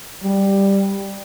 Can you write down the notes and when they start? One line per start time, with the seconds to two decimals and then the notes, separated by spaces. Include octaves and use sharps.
0.23 G3